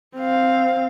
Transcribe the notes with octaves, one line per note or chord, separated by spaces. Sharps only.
C4 F5